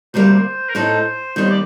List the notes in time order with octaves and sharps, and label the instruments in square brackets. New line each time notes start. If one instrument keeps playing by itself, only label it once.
[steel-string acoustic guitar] D2 C3 G3 A#3 [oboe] C5
[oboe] A#4
[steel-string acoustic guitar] A2 A3 D#4 A4 [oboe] C5
[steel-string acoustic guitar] D#2 D#3 G3 C4 [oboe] C5
[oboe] D5